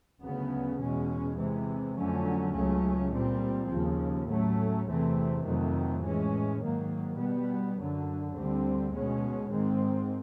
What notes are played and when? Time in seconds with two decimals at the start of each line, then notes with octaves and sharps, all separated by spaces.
0.21 D2 C#3 F#3 B3
0.79 E2 B2 G#3 C#4
1.37 C3 E3 G#3
1.96 F2 D3 F#3 A3 C#4
2.54 C#2 C#3 F#3 A3 C#4
3.12 A#2 G3 C4
3.69 D#2 C#3 F3
4.28 A2 F#3 A3 C#4
4.86 E2 C3 E3 A3 C4
5.44 F2 C3 D#3 F#3 A3
6.03 A2 E3 G#3 C#4
6.61 G#2 D#3 F#3 A#3
7.18 B2 G3 B3
7.76 F#2 D3 F#3
8.34 D2 D3 G3 C4
8.93 B2 G#3 C#4
9.50 G#2 D#3 G#3 C4